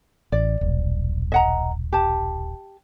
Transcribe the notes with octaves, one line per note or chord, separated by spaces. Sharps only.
A1 D5
D#1 B1
D#5 F#5 A#5
G4 A5